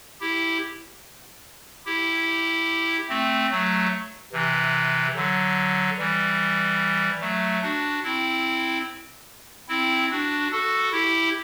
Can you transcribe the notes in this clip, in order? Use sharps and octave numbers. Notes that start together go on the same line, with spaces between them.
E4 G4
E4 G4
A3 C4
F#3 A3
C3 E3
D3 F#3
E3 G3
F#3 A3
D4 F#4
C4 E4
C4 E4
D4 F#4
F#4 A4
E4 G4